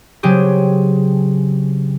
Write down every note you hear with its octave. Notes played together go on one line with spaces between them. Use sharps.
C#3 F#3 C4 G4 G#4